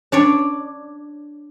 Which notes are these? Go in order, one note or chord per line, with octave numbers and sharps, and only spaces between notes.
D4 C#5 D5